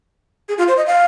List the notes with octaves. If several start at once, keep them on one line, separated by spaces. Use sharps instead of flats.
G#4
F4
C5
D#5
F5